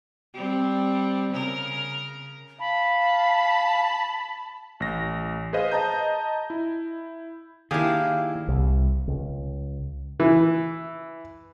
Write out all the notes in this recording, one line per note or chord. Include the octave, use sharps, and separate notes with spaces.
G3 C4
C#3 A#4
F5 A5 B5
A1 A#6
G#4 B4 C5 D#5 F5
D#5 A5 A#5 G6
E4
D#3 A#3 D4 E4 G4 G#4 F5
C2
C#2
E3